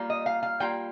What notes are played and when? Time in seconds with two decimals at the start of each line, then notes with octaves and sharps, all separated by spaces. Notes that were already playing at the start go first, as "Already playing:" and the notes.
Already playing: G3 A#3 F4
0.10 D#5
0.26 F5
0.43 F5
0.60 G3 A#3 F4 G5